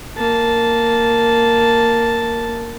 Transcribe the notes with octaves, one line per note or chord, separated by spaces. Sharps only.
A#3 A5